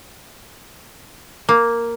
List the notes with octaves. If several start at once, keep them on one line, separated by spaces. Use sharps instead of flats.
A#3